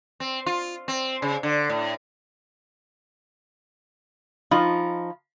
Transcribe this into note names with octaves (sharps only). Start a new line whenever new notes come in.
C4
F4
C4
C#3
D3
A2
F3 D#4 F4 B5